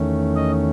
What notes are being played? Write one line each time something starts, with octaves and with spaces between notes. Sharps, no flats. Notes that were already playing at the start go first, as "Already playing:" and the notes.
Already playing: E2 D#3 A3 C#4
D#5